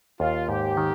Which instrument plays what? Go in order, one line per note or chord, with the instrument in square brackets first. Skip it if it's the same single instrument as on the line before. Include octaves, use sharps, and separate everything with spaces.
[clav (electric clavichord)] D#2 [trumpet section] F4
[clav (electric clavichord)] G#2 [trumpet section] G4
[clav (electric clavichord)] D#3